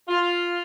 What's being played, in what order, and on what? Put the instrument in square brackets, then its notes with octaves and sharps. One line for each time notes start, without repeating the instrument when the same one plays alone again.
[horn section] F4